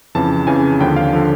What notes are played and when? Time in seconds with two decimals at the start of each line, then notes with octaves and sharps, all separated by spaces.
0.15 F2 C#3 E3 A5
0.47 F2 C#3 E3 G#5
0.81 D#2 D3 F3 G5
0.96 F5
1.13 D3 F3